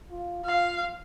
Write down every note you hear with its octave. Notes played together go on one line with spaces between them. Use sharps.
F4
F4 F5